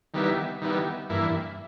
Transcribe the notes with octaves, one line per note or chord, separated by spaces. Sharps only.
D#3 G3 B3 E4
D#3 G3 B3 E4
G2 E3 A#3 E4